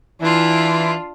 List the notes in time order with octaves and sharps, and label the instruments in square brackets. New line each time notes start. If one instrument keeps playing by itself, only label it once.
[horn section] E3 [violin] D4 F4